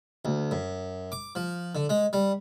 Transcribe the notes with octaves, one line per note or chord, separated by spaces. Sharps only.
D2
F#2
D6
F3
D3
G#3
G3